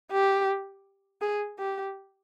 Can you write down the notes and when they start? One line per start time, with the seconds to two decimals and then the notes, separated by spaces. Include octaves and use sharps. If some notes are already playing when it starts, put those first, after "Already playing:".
0.11 G4
1.21 G#4
1.59 G4